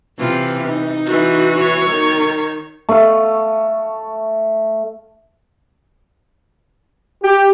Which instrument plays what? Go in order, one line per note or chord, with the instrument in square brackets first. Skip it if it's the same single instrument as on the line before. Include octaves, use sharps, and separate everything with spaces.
[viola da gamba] C3 F4 [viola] E3
[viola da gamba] D#4
[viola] E3 F#4
[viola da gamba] C#5
[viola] D#3
[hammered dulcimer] A3 F5
[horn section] G4